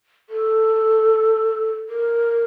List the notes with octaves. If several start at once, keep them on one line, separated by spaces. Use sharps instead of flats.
A4
A#4